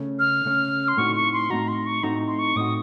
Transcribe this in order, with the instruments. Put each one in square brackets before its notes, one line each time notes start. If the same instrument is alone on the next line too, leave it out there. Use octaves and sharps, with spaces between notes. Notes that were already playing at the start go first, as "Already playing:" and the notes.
Already playing: [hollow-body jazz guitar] C#3 A3 C#4
[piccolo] F6
[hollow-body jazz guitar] C#3 A3 C#4
[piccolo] C6
[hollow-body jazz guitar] A2 A3 C4 D#4 F#4 [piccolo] C#6
[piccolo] C#6
C6
[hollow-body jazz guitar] A2 A3 C4 D#4 F#4 [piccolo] A#5
[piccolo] C6
C#6
[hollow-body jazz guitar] A2 A3 C4 D#4 F#4 [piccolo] A#5
[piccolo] C6
C#6
[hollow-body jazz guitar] A2 A3 C4 D#4 F#4 [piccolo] D#6